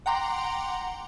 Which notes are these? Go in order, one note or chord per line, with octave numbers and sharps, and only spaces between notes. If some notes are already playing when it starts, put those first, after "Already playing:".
F#5 G5 A#5 C6 D6